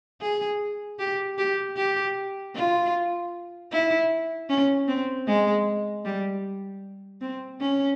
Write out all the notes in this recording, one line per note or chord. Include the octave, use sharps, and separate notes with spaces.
G#4
G4
G4
G4
F4
E4
C#4
C4
G#3
G3
C4
C#4